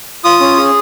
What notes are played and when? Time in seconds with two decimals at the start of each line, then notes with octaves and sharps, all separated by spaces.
0.24 F4 D#6
0.41 C#4
0.57 G#4